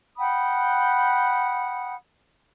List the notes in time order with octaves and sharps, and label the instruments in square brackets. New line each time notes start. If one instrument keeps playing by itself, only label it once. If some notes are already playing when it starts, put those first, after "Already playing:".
[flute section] F#5 G5 B5 D#6